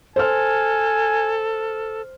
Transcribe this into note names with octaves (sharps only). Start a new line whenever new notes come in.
A4 C5 G#5 F6